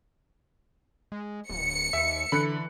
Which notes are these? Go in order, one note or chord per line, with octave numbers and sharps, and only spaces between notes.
G#3
D1 C#7
D#2 E5
D3 E3 B5 F#6 C#7